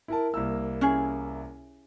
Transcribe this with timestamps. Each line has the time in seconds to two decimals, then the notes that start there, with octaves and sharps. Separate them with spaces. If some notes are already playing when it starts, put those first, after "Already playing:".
0.08 E4 A#4 A5
0.34 C2 A#3 E6
0.81 C#4 E4 G#4